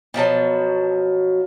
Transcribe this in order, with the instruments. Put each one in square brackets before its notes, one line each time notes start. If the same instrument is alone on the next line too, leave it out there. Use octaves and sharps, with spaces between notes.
[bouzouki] B2 F3 F#3 A5